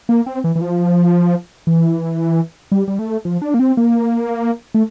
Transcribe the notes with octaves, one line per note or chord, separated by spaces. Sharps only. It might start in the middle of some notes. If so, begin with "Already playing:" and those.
A#3
C4
E3
E3
F3
E3
G3
G3
A3
F3
D4
A#3
C4
A#3
A3